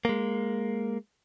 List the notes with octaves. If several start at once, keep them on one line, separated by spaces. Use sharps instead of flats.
G#3 A#3